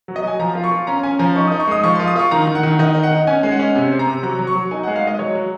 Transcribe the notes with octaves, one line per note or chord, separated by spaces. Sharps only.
F#3
D#5
F#3 G#5
F3 A#5
F4
C#6
F4
C#4 A#5
C#4 G#5
F3 A#5
D#4 C#6
D#6
D#4
C#6
G#3 D#6
F3 C#6
C6
F4
D#6
F4 C#6
D#3 A#5
D#3
F#5
D#3
D#3 D#5
D#4
F#5
D#4
C#4 G#5
G#3
F#5
C#4
C3
C4
A#5
C3
F#3 A#5
F#3
C#6
F#3
D#4 G#5
F#5
G#3
F5
G#3 D#5
F#3 C#5
F#3